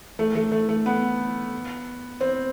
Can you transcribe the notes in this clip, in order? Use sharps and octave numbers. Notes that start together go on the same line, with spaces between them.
A3
A3
A3
A3
B3
C4